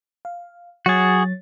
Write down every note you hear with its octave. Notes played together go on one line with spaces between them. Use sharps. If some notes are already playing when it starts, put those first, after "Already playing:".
F5
F#3 F#4 G#4 C#5 A6